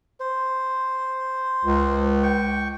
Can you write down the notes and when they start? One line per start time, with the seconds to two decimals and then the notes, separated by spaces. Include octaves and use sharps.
0.20 C5
1.65 C#2
2.23 G5 C#6